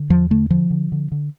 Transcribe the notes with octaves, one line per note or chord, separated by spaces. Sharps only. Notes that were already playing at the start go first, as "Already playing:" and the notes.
Already playing: D3
E2 F3
D3 A3
D3 F3
D3
D3
D3